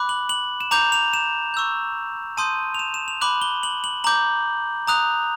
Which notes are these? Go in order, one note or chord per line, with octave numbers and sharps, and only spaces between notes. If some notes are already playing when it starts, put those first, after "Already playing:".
Already playing: B5 D6 F#6
F#7
F#7
E7
A#5 D6 G6 F7
F7
E7
C#6 E6 G6
A5 C6 D#6 G6 D#7
F7
E7
E7
F7
B5 D6 F#6 F#7
G7
F#7
F#7
A#5 D6 G6 F#7
A#5 D#6 F#6 F7